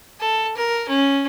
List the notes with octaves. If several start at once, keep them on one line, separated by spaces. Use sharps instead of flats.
A4
A#4
C#4